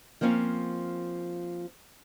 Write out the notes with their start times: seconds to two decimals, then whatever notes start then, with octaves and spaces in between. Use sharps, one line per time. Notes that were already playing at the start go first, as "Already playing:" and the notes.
0.21 F3 A#3 C4 C#4 F4